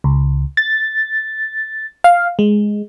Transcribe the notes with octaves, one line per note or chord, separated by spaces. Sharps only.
C#2
A6
F5
G#3